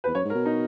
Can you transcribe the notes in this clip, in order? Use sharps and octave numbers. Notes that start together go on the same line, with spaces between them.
E2 B4
F#2 C#5
G#2 A#4
B2
D#4